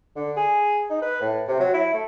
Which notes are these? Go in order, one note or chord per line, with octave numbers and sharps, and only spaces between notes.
D3
G#4
D#4
B4
A2
C3
F#3
E4
A3